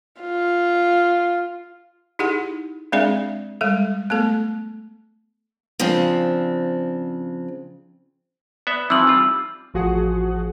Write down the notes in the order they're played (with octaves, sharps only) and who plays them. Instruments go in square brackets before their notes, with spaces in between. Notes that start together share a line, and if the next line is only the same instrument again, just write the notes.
[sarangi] F4
[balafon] D#4 E4 G4 G#4 F#5
G#3 C4 D4 G#4 D5 E5
G3 G#3 A4
A3 B3 A4
[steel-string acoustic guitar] C#3 F3 C4 D4
[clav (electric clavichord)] B3 E5 [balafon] D5
[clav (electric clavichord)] E3 F3 [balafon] C4 D#4 E5 [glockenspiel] E6 F#7
[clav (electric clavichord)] G3 F4
[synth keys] A1 F3 F#4 G#4 F#5